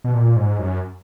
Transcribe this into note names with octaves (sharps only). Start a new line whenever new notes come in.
B2
A#2
G#2
F#2